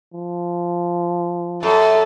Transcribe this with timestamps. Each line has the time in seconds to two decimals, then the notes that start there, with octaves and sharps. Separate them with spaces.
0.13 F3
1.63 F#2 A4